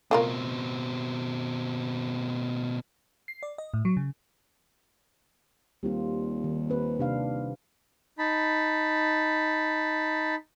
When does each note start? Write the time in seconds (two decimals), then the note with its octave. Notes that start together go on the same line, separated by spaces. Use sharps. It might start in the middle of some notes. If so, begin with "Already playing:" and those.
0.11 B2 A3 C4 F4 A#4
3.28 C7
3.43 D5
3.58 D#5
3.74 A2
3.85 F#3
3.97 C#3
5.83 D#2 G3 C4 F4
6.44 D#3
6.70 C4 B4
6.99 C3 D4 F5
8.19 D#4 A5 B5